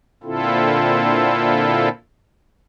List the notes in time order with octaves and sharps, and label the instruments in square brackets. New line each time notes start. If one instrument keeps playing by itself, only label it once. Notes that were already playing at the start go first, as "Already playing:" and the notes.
[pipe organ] A#2 D3 C4 E4 F4 A4